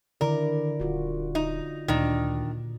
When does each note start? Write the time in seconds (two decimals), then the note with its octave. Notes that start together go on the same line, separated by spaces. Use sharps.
0.21 D3 D#3 E4 A#4 D5
0.80 D#1 F4 F#4
1.35 D#4
1.88 D2 A#2 D#3 D4